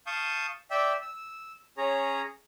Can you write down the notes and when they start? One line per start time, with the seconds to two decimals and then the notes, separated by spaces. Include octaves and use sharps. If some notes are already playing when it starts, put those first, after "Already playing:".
0.07 F5 A5 C#6 D#6 G6
0.71 D5 E5 G5
1.01 E6
1.77 C#4 G#4 C#5 A#5